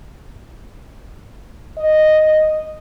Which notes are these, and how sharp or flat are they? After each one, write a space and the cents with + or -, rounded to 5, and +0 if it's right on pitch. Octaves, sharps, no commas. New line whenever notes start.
D#5 -5